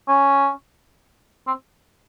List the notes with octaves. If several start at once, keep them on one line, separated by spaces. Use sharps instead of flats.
C#4
C4